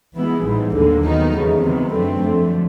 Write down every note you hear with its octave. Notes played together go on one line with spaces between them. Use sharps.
E3 G#3 B3 E4 G#4
A1 G#2 E3 G3
D#2 D3 G3 A#3
D#3 F#3 B3 D#4
E2 C#3 E3 A3
C3 D#3 F#3 B3
F#2 D3 F#3 A3 C4
F2 D3 F#3 A3